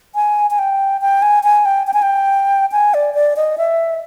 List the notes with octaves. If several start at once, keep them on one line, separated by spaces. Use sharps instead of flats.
G#5
G#5
G5
G5
G#5
G#5
G5
G5
G#5
G5
G#5
D5
D5
D#5
E5